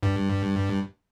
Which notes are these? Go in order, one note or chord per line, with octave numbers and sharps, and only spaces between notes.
G2